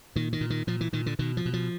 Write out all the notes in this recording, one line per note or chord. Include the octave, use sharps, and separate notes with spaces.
A#2 D#3
D#3
A#2
D#3
A#2 F3
E3
A#2 D#3
D3
B2 D#3
F3
B2
F3